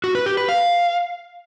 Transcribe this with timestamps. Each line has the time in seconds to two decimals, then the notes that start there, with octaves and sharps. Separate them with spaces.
0.04 F#4
0.15 B4
0.26 G4
0.37 B4
0.49 F5